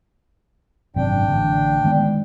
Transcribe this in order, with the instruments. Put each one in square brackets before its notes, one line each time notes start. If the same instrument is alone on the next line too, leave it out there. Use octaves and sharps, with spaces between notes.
[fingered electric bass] G#1 F#2 C3 [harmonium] D4 G5
[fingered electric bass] A1 D3
D#3 G#3 B3